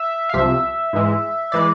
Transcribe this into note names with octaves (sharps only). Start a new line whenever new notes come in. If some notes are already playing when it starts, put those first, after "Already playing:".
Already playing: E5
F5
C2 C3 F3 E5
G#2 E3 G#3
E3 G#3 D5